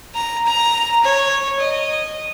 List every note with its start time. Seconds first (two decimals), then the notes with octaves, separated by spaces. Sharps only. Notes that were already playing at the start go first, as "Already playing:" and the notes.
0.14 A#5
0.46 A#5
1.04 C#5
1.59 D#5